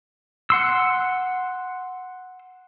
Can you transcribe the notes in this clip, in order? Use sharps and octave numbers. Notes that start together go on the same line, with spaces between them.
F#5 C6 E6